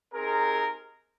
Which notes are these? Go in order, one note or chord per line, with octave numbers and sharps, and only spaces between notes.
C4 D#4 G4 G#4 A#4